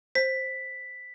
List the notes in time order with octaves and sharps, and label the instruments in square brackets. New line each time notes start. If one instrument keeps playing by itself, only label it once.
[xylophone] C5 [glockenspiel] B6